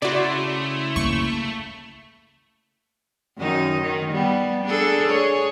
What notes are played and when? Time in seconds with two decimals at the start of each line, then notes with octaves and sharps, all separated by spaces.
0.02 C#3 A3 E4 F#4 D5 C6
0.96 A#3 C#6
3.38 F#2 D#3 D#4
3.80 D#3
4.12 G3 B3
4.65 D4 G#4 A4
5.10 G#4 C#5